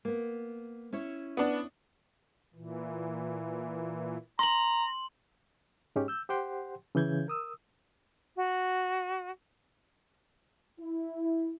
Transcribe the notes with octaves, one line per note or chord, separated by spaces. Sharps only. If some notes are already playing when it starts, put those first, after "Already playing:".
A#3 B3
C#4 E4 C#5
B3 D4
A#2 E3
A#5 C6 F#7
G#2 G#3 C#4 G4
E6 G6
G4 C5 F#5 G5 C6
C#3 E3 G6 G#6
A#4 D#6 E6
F#4
E4